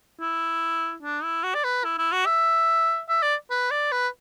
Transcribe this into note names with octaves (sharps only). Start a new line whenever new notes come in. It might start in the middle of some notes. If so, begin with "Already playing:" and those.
E4
D4
E4
F#4
D5
B4
E4
E4
F#4
E5
E5
D5
B4
D5
B4